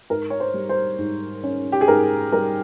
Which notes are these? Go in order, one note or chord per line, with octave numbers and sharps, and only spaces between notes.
G#2 A#4
C#5
C5
G3
C5
G#2
C#4
G4
G#4
G#2 A#4
G3 A#4